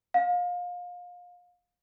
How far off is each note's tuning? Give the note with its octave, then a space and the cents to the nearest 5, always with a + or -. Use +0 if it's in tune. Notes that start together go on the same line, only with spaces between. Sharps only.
F5 +30